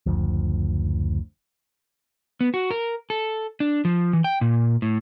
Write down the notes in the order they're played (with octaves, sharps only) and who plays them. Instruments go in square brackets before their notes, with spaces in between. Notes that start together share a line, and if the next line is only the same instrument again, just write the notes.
[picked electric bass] F#1 D2 F3
[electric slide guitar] B3
F#4
A#4
A4
D4
F3
E3
G5
A#2
A2